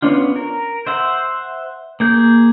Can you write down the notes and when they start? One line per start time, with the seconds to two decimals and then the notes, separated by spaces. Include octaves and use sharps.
0.02 B3 C#4 D4 F4
0.36 A#4
0.87 C5 E5 F#5
2.00 A#3 G#4 G6